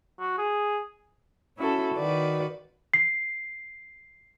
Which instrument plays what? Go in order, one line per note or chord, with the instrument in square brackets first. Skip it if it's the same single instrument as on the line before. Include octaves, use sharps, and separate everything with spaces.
[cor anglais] F#4
G#4
[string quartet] C#4 E4 F#4 A4
D#3 F#4 B4 D5
[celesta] C7